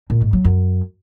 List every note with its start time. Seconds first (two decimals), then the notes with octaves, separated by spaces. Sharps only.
0.10 A#2
0.21 G#2
0.33 F#3
0.45 F#2